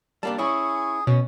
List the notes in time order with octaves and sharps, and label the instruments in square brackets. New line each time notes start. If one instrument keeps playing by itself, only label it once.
[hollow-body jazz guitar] G3 A#3 D4 [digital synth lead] A5
[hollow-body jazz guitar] C#4 E4 [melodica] G#4 [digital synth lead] C#6
[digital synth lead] B2 [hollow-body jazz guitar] C#4